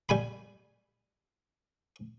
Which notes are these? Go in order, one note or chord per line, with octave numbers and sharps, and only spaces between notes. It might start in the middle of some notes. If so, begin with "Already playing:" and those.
G3 G#5 B5